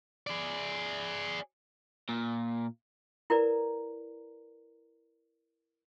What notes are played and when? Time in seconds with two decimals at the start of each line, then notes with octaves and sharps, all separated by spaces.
0.27 G#4 D5
2.09 A#2
3.30 E4 A#4 B4 D5 A#5